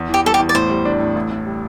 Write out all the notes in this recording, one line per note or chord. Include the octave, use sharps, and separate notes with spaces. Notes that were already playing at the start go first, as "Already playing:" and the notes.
Already playing: E2
E3
G4
G3 A4
G4
E2
D5
A2 C5
G3
D4
A2
A1
A2
G3